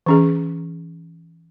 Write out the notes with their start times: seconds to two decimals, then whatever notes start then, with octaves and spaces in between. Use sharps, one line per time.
0.06 E3 C#4 G#4